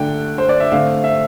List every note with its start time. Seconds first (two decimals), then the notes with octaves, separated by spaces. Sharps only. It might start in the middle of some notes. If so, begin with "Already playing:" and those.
Already playing: D3 A3 D4 G5
0.38 C5
0.49 D5
0.60 E5
0.72 D3 A3 C4 F5
1.04 E5